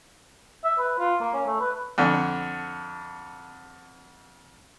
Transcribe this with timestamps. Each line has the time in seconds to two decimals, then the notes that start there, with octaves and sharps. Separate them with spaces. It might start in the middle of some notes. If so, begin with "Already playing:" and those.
0.65 E5
0.78 B4
0.99 F4
1.21 A#3
1.34 C#4
1.46 A3
1.60 B4
1.98 F2 D3